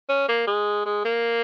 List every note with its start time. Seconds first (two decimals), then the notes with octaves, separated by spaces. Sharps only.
0.09 C#4
0.28 A#3
0.47 G#3
0.86 G#3
1.05 A#3